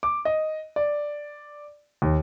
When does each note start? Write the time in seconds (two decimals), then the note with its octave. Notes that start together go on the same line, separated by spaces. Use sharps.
0.03 D6
0.25 D#5
0.76 D5
2.02 D#2